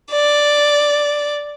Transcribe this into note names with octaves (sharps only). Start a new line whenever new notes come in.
D5